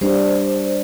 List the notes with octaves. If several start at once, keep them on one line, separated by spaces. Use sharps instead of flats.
G3 D4 C5